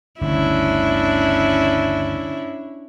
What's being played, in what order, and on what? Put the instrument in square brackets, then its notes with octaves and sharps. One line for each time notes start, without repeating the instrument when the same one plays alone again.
[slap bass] G1 D2 C#3 [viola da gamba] C#4 D4 E4